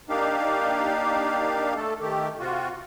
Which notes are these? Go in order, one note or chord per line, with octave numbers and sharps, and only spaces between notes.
A#3 D4 D#4 G4 F5
A3 A4
D#3 A3 G4
C3 F4 F#4